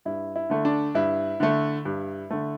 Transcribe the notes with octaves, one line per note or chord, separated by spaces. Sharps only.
G2 E4
E4
D3 A3
D4
G2 E4
D3 A3
G2
D3 A3